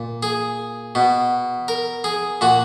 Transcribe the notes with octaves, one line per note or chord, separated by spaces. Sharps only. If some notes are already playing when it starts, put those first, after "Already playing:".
Already playing: A#2
G#4
B2
A#4
G#4
A#2 F#4